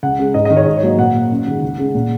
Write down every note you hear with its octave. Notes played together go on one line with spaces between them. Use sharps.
C#2 F#5
C#3 G#3
G#2 D#5
D#5
D#3 G#3
C#5
G#2 D#5
C#5
F#3 A#3
D#5
A#2 F#5
A#3
F#2
D#3 G#3
C#2
C#3 G#3
A#2